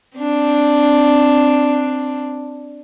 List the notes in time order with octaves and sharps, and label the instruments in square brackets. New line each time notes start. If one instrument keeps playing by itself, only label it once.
[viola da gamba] C4 D4